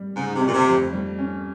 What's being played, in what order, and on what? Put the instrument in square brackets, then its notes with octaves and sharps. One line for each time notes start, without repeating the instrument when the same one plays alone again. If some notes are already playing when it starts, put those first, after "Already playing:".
Already playing: [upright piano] G3
[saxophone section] G#2 [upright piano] C#3
[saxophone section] C3
[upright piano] G1
[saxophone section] A#2
C3
[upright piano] F2
G3
C#4